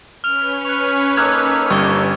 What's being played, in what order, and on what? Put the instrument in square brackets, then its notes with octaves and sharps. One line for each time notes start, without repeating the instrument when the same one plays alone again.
[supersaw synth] C#4 B4 C#5 [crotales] F6 F7
[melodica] C#6 [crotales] F#6 F7
[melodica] A#3 D#4 A4 [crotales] D6 [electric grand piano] F6 F#6 G#6
[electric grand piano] G1 G3 C#6 [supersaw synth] G#5 [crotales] G#6 G7